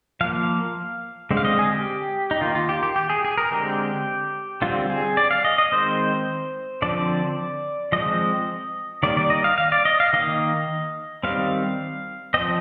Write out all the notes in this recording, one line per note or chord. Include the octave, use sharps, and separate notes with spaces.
F3 A#3 F5
D3 G#3 C4
F5
D#5
G#4
G4
D#4
D#3 A#3 F4
F4
G4
G4
G4
G#4
G#4
A#4
D3 G#3 C4 G4
D3 G3 C4 F4
G#4
D5
F5
D#5
D#5
D#3 G#3 C4 C5
D3 F3 C4 D5
F3 G#3 C4 D#5
D#3 G3 A#3 D5
D5
D#5
F5
F5
D5
D#5
F5
D#3 A#3 D#5
D#3 G3 C4 F5
F3 C4 D#5